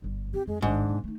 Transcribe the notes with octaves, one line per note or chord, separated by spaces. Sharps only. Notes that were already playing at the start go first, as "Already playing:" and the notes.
G1 G3
C4 G4
F2 G#3
A1 G#2 D#3 D4
C3 B3
A3 D#4